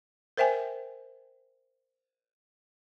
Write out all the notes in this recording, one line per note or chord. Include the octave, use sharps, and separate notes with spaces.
A#4 C5 E5 G5 G#5